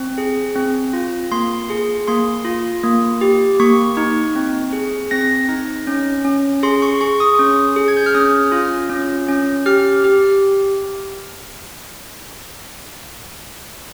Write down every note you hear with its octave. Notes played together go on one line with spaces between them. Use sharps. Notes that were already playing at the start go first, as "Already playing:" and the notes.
Already playing: C4
G#4
C4
F4
A#3 C6
G#4
A#3 C6
F4
A#3
G4
A#3 C#6
D#4
C4
G#4
C4 A#6
D#4
C#4
C#4
G#4 C6
C#6
G#4 C#6
D#6
C#4
G#4
G#6
G6
F6
C#4 D#6
F4
C#4
C#4
G4 F6
G4